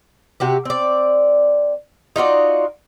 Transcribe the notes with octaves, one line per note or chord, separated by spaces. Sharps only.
C3 F#4 G4
C4 D5
D#4 F4 F#4 D5